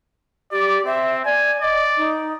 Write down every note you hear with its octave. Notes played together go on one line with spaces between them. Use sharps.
G4 D5
C4 E5
D5 G#5
D5 D#5
D#4